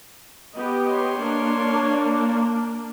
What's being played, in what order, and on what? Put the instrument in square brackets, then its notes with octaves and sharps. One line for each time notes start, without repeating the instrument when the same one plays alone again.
[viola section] B3 G4 D#5
[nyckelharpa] C#5 C6
[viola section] A#3 D4